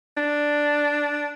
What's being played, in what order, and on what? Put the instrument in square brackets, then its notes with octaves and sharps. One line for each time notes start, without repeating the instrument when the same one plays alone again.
[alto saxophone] D4